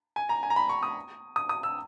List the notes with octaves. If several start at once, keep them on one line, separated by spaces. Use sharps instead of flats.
G#5
A#5
G#5
A#5
B5
C#6
D#6
D#6
D#6
E6